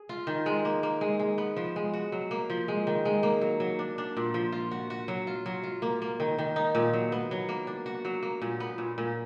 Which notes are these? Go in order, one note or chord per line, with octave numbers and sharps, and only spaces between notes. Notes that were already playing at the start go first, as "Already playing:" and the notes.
Already playing: G#4
F4
D#3
G#3
A#3
A#3
G#3
G#3
B3
F3
G#3
F#4
F#3
A#3
F3
G#3
D#3
G#3
A#3
F#3
F#3
D4
D4
A#2
F3
F4
F#4
F#4
F#3
F4
F#3
F4
A#3
A#3
D#3
D#3
D#4
A#2
F#3
B3
F#3
A#3
D4
F#4
F#3
A#3
A#2
B3
A#2
A#2